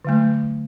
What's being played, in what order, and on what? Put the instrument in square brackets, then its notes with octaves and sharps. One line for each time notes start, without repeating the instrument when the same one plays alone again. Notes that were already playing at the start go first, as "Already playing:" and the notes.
[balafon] D3 F#3 A3